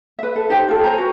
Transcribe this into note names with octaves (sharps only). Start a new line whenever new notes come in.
B4 E5
A4
D#4 G4 C5 G5
F4 A4
C5 G#5 A#5
F#4 B4